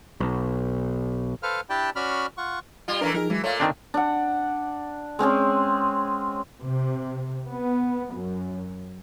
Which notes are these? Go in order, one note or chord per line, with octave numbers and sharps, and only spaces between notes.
B1
A4 B4 C5 F5 F6
D4 E4 G4 D5 G5 A5
C#4 F#4 D5 B5 F6
F4 F#5 C#6
G3 F4
E3 A3 D4 A#4 B4 A#5
F3 D#4 G#4 A#4
E3 F#3 G#3
A#2 A3 C#5 F5
D#3 C4 D4
D4 F#5
G#3 C4 C#4 G#4
C3
B3
F#2